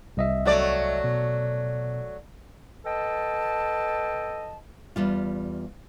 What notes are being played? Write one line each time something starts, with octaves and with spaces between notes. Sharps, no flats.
C2 D#5 E5
F#3 A3 D5
B2
A4 B4 D#5 G5 A5
E2 G3 F4